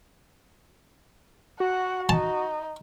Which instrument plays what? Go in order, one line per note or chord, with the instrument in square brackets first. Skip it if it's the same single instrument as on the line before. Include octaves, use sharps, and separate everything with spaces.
[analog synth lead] F#4 [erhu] F#5
[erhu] D#4 [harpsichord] A5